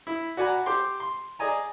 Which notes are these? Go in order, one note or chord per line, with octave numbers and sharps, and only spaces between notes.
E4
F#4 D5 F#5 G#5 A#5 B5
G4 C6 D6
C6
G#4 D5 D#5 G#5 A#5